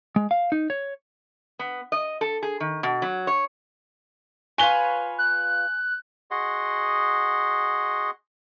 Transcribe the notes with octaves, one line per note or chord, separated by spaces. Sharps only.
G#3
F5
D#4
C#5
B3
D#5
A4
G#4
D#3
B2
F#3
C#5
F4 B4 C#5 G#5 G7
F#6
F#4 G#4 D#5 F#5 C6